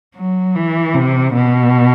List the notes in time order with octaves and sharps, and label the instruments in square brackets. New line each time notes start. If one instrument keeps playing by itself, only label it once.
[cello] F#3
E3
C3
B2